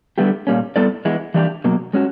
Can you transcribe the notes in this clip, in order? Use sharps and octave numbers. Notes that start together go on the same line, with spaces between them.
D3 G3 B3 E4 G4
A#2 G3 A#3 C#4
G3 B3 E4 A4 D5
E3 G#3 B3 E4
E3 G3 A#3 D4 G4
B2 F#3 A#3
G#3 C#4 F#4